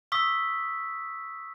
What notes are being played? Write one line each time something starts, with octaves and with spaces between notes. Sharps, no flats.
C#6 D#6 E6 B6